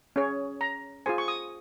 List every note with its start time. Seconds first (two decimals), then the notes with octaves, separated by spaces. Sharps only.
0.16 C#4 G#4 C#5
0.61 A#5
1.06 F4 G#4 C5 G#5
1.18 C#6
1.28 D#6